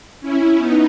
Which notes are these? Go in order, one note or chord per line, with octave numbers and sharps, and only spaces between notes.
C#4 E4
B3 D#4